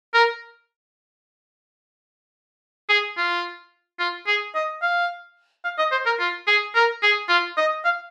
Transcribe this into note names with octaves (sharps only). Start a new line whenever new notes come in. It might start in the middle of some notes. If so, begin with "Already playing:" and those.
A#4
G#4
F4
F4
G#4
D#5
F5
F5
D#5
C5
A#4
F4
G#4
A#4
G#4
F4
D#5
F5